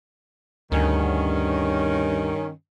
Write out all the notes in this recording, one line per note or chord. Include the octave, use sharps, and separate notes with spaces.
D2 G2 D#3 C#4